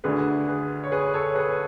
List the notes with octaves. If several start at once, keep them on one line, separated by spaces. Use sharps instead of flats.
D2 D3 G#4 B4
G#4 B4
C#5
G#4 B4
A4 C#5
G#4 B4